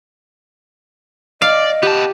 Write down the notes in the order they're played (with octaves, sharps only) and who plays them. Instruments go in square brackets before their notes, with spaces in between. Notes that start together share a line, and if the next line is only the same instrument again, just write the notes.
[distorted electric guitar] D5 [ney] D#5 [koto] F5
[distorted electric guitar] B3 A5 [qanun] G4